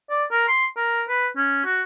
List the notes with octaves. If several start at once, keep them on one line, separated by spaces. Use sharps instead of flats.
D5
A#4
C6
A#4
B4
C#4
F#4